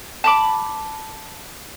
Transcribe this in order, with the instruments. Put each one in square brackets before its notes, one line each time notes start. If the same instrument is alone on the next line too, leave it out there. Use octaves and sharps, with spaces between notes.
[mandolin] A5 B5 D6